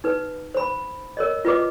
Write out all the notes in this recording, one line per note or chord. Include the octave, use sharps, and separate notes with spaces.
D#4 B4
C5 B5
A#4 C#5 D#5
F4 B4 D#5 D6